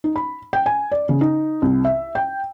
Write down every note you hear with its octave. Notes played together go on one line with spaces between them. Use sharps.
D#4
B5
G5
G#5
D5
C#3
D#4
C2
E5
G5